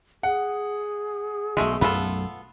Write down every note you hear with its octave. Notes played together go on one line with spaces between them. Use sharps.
G#4 F#5
B1 B2 G#3 A3
B1 F#2 A3 B3 F4 A4